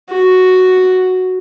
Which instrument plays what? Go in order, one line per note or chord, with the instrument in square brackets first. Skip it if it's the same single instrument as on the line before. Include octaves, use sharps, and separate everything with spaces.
[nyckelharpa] F#4